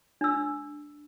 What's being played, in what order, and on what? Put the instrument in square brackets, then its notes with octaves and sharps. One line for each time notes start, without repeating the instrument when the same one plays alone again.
[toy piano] D4 E6